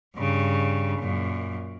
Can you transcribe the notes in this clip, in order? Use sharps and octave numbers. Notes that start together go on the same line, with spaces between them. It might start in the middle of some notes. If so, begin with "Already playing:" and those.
G2 C#3
F#2 A#2